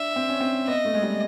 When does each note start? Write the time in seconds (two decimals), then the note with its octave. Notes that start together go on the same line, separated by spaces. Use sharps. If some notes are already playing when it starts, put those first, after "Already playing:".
Already playing: D4 E5
0.16 C4
0.29 C#4
0.40 C4
0.67 B3 D#5
0.85 A3
0.94 G#3
1.02 G3